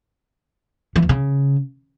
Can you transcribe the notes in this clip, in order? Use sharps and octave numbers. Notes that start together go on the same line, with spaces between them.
E3
E2
C#3